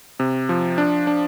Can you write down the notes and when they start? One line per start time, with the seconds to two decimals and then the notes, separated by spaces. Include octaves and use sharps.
0.20 C3
0.49 F3
0.78 D4
1.07 D4